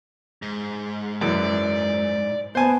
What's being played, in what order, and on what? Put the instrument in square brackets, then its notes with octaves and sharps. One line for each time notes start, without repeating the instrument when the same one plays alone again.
[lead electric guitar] G#2
[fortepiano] F#2 E3 [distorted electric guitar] D5
[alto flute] B3 [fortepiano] C5 G#5 A5